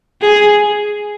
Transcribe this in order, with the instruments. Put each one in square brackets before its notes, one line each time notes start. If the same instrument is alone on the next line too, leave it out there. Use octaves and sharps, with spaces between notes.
[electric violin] G#4